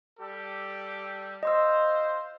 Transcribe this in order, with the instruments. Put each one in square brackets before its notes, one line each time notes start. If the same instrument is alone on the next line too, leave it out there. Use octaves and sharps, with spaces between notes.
[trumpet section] G3 G4 A4
[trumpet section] F4 C5 [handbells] D#5 C6 E6